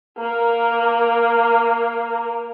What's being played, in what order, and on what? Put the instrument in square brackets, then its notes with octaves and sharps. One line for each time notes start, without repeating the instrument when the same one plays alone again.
[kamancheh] A#3 A#4